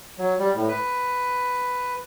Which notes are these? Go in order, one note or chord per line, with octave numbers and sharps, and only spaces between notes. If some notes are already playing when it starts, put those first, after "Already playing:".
F#3
G3
A2
B4